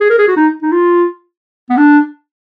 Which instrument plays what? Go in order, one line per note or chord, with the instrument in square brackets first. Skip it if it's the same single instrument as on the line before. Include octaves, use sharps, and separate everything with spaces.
[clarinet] G#4
A#4
G#4
F#4
D#4
D#4
F4
B3
D4